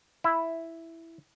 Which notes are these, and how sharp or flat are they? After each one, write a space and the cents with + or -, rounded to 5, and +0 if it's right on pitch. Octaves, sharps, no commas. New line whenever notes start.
E4 +0